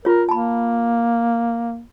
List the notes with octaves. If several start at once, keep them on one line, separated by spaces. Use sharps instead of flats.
F4 A#4 C#5
A#3 A5 B5